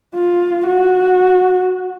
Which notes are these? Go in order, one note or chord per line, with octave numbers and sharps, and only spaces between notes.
F4
F#4